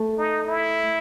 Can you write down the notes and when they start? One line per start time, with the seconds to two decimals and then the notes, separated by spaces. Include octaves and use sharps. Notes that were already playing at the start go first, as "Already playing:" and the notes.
Already playing: A3
0.18 D#4
0.46 E4